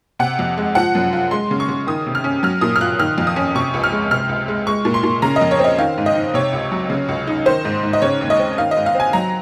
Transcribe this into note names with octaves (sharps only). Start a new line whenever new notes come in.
C3 F#5
F2
G#3
F3 F#5
F#2
F4
G#3 C6
C#3
C#6
C#3
D#3 D#6
C3
F6
C#4
F#3 F6
A#2 D#6
F6
F4 F#6
D#3 F6
F2
D#6
C#4
C3 C#6
C#2
F6
G#3
C3 F6
C#2
G#3
G#3 C#6
A#2
C6
A#2
C#3 A#5
D#5
F2
C#5
C4 D#5
D#3 F5
G#2
D#5
D#4
C3 C#5
C#2
F#3
C#3
C#2
D#4
D#3 C5
G#2
G#2
D#5
C#3 C#5
D#2
D#5
C4
D#3 F5
D#5
G#2
F5
C4 G#5
F#3 A#5